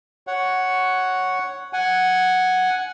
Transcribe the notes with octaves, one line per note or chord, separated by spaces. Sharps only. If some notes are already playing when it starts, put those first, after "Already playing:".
C#5 F#5
F#5 G#5